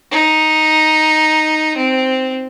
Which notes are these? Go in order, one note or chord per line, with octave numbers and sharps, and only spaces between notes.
D#4
C4